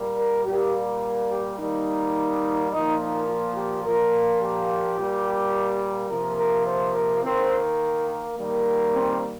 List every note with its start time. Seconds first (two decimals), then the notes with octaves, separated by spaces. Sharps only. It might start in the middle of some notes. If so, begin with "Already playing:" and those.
Already playing: A#2 G3 A#3
0.18 A#4
0.46 A#2 G3 A#3 G4
1.31 G4
1.59 D#3 G3 A#3 D#4
2.72 A#2 F3 A#3 D#4
3.00 D#4
3.28 F4
3.56 G4
3.84 A#2 F3 A#3 A#4
4.41 G4
4.98 A#2 G3 A#3
6.10 C3 F3 A#3 A#4
6.38 A#4
6.67 C5
6.95 A#4
7.23 D#3 A#3 C4
8.35 D#3 G3 A#3
8.92 C4